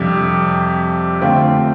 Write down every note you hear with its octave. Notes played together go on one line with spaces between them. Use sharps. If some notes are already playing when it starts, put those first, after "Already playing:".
Already playing: F2 C3 G3 D4
D3 A3 C4 F4